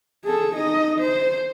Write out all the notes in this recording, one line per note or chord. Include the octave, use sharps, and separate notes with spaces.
G#4 A4
D#4 D#5
C5